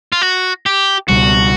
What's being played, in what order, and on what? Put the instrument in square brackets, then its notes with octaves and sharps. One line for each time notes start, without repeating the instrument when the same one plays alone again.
[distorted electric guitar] F4
F#4
G4
[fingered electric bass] C#2 B2 G3 [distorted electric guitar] F#4